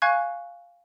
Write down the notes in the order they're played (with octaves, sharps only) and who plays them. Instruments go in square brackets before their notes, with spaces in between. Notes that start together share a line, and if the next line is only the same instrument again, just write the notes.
[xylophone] F5 G#5 C#6 F#6 G#6